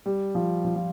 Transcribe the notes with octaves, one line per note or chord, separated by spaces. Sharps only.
G3
F3
F3
F3